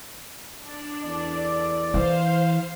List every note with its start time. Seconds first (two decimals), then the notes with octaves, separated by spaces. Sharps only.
0.63 D4
1.04 E2 A4 D5
1.94 E3 C5 F5